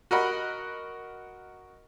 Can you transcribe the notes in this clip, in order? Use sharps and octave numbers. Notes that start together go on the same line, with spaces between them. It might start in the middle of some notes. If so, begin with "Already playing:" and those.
F#4 A#4 D#5 F#5 B5